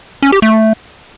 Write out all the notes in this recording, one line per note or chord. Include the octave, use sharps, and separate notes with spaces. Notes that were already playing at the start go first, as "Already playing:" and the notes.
C#4
G4
A3